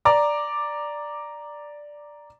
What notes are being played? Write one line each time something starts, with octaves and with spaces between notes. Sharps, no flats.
D5 A#5 D6